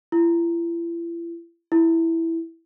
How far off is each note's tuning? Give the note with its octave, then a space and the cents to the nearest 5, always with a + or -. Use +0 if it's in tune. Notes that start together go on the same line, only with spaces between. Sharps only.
E4 +40
E4 +0